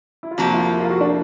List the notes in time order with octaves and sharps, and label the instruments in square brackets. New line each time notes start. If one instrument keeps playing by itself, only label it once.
[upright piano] E4
F4
[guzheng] F2 C3 F3 A#3 [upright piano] F#4
[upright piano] F4
E4
F4
F#4
D4